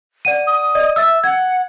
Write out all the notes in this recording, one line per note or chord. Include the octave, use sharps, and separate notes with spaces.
D5 F#5 D#7
D#6
D5 D#5
E5 E6 A6
F#5 G#6